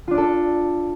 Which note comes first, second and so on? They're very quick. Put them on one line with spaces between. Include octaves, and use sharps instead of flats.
F4 D4 D5 A4